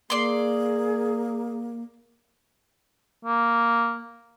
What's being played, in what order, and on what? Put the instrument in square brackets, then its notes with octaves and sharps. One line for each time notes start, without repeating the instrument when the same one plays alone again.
[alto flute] A#3 [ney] G#4 [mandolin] D5 C6
[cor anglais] A#3